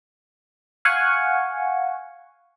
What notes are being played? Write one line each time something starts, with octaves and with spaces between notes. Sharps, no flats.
F5 F#5 G#5 C#6